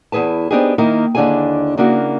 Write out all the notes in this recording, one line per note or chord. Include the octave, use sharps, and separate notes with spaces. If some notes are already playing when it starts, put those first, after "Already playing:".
E2 E4 G#4 B4 A5
B3 C4 D4 D#4 G4 G#4
D#3 A#3 D#4 E4
D#2 D3 D4 E4 G#4 G#5
C#3 A#3 D4 E4 F#4